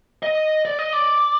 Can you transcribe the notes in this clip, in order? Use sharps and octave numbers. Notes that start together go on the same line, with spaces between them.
D#5
D5
D#5
D5